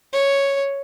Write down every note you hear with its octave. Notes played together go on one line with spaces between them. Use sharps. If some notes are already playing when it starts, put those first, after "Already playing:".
C#5